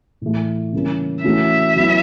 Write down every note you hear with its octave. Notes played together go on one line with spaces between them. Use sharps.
A2 E3 A3
C#3 E3 G3 A#3 C#4
E3 A3 C#4 F#4 A4 E5
F#3 B3 E4